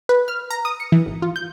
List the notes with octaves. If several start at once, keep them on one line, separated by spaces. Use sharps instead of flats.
B4
F6
A#5
D#6
C#7
E3
G#1
F4
G6